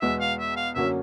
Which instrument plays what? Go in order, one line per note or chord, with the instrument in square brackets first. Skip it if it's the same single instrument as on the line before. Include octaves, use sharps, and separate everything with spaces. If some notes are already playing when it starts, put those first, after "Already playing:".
[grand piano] E2 B2 G#3 B3 [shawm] E5
[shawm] F5
E5
F5
[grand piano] F#2 D3 F#3 A#3 C#4 [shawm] E5